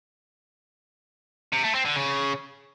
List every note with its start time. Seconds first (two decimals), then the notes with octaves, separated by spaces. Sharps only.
1.53 C3
1.64 A3
1.75 C4
1.85 D3
1.96 C#3